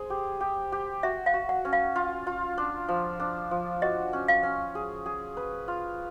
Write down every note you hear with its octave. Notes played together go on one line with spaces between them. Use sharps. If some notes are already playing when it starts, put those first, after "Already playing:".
Already playing: G#4 C5
G4
G4
G4
F#4 E5
F5
F#4
F#5
C#4
F5
F4
F4
D4
F3
D4
F3
F#4 D#5
C#4
F5
C#4
G#4
G#4
B4
F4